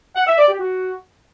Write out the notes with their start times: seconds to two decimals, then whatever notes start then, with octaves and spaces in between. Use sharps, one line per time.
0.16 F#5
0.27 E5
0.38 D5
0.48 G4
0.59 F#4